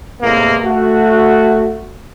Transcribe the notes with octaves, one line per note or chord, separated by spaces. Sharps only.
E2 A2 C3 G#3 A#3
A3 F#4